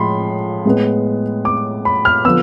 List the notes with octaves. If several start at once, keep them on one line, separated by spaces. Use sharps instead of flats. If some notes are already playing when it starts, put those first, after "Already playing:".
Already playing: A2 F3 G#3 B5 C6
A2 G#3 B3
D6
B5
F6
D3 F3 B3 E6